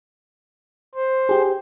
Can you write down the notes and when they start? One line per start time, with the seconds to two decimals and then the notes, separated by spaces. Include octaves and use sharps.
0.95 C5
1.29 G4 G#4